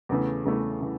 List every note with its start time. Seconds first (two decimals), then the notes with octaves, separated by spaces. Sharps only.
0.09 E2 C#3 E3 A3
0.45 E2 C#3 E3 A3
0.81 C#3 E3